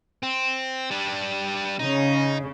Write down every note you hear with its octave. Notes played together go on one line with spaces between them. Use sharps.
C4
G3 D4
C#3 D#4